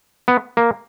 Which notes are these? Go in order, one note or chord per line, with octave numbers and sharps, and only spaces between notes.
B3
A#3